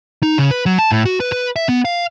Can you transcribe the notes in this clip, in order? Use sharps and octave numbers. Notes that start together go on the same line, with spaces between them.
D#4
C#3
B4
F#3
A5
A2
F#4
B4
B4
E5
B3
F5